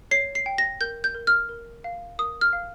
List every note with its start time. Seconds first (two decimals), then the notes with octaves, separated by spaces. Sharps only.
0.11 C#5 C7
0.35 C7
0.46 G5
0.58 A#6
0.81 A#4 G6
1.04 G6
1.15 A#4
1.27 F6
1.49 A#4
1.84 F5
2.19 A#4 D#6
2.41 F6
2.53 F5